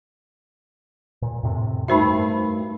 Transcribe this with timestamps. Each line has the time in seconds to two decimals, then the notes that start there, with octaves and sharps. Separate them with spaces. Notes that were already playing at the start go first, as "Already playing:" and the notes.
1.22 A#2
1.43 F2 A2 C3
1.88 G2 A3 D#4 F#4 A#4 C5 E5 B5